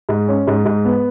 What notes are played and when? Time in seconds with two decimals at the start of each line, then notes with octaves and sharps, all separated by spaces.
0.09 G#2
0.28 C#4
0.47 G#2
0.65 G#2
0.85 B3